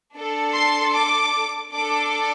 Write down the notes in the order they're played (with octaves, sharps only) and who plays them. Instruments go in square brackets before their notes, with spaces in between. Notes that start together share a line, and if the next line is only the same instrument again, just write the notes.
[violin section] D4 A4
C6
D6
D4 A4 D6